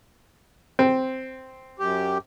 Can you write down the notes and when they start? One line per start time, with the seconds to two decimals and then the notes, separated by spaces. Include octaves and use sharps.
0.79 C4
1.80 F#2 G4